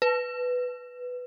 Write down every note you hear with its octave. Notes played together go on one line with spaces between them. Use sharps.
B4